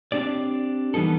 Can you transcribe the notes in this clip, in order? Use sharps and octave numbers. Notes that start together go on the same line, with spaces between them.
C4 D4 G4 D5
E3 G3 B3 D#4 A4